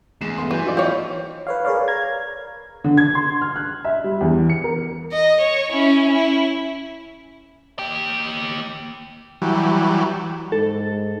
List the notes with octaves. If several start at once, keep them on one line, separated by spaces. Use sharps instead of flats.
E2 G#3 C7 E7
G2 A3 B3 C6
E3 F#4 G#4 B4 G#5 G6
F#3 D#4 F4 D5
C5 C#5 D#5 F5 G5
B4 C#5 F5
G#4 A#4 B4 C#5 D5 F5
F5 A#5 G#6
D3
G#6
C6
F6
F#6
E5
G3
E2
C#7
A#4
D#5
C#5
C#4 E4
E4
A#3 G5
E3 F#3 G3
G#2 A4